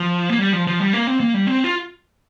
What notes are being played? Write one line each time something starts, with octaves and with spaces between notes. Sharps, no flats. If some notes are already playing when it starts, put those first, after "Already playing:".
Already playing: F3
A#3
G3
F3
F3
G3
A#3
C4
A#3
G3
C4
F4